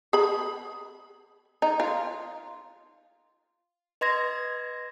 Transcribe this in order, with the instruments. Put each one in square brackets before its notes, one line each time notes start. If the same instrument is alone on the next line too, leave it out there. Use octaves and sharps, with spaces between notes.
[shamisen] G#4 B5
D#4
F4
[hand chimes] B4 D#5 C6 G#6 A#6